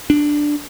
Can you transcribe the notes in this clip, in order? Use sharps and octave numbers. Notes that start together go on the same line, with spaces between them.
D4